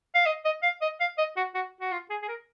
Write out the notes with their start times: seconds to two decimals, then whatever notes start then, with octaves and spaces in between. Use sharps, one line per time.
0.15 F5
0.26 D#5
0.45 D#5
0.63 F5
0.82 D#5
1.00 F5
1.18 D#5
1.37 F#4
1.55 F#4
1.81 F#4
1.92 F4
2.10 G#4
2.22 G#4
2.28 A#4